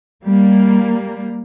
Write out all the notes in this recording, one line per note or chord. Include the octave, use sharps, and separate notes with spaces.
G3 A#3